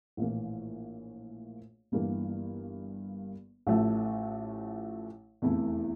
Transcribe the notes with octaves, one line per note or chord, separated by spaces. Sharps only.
A#1 A2 E3 A#3
G1 G2 E3 A#3
A1 A2 F3 A3
F1 E2 E3 A3 E4